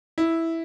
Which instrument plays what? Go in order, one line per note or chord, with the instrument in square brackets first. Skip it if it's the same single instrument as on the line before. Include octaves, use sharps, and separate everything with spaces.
[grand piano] E4